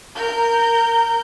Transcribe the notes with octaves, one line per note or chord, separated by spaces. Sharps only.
A#4 G6